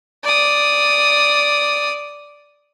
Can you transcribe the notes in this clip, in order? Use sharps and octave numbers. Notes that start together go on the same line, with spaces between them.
D5 D#6